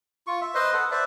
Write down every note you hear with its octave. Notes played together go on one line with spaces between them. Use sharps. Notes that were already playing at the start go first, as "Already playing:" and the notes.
F4 C#6
E5
B4 C5 D#5 C6
A4 B4 F#5
B4 C5 D5 E5